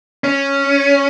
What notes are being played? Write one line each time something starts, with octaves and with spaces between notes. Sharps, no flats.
C#4